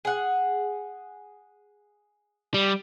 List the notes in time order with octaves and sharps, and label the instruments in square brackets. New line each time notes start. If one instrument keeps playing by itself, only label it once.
[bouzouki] G#4 F#5
[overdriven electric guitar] G3